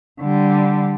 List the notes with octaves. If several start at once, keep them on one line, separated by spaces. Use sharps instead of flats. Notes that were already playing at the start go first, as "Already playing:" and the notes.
D3 G3